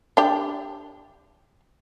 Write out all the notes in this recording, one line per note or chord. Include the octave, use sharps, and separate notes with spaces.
D4 G4